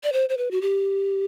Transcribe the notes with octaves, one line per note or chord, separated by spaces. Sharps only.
D5
C5
C5
B4
F#4
G4